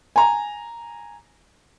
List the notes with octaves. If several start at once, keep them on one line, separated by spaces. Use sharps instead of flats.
G#5 A#5